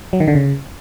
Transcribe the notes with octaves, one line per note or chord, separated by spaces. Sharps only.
F#3
D#3
D3
C#3